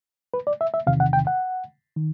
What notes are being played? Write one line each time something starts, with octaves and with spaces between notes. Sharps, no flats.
B4
D5
E5
E5
E2 C3 D#3 F5
F#5
G5
F#5
D#3